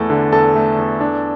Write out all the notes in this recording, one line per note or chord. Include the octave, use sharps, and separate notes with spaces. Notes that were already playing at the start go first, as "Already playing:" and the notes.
Already playing: E2 A3 A4
D3
E2 A4 A5
A3
E2
D4